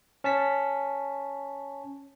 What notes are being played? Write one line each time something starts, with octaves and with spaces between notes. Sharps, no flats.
C#4 A5 B6